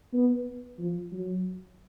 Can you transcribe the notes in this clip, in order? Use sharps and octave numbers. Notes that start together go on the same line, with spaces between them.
B3
F3
F#3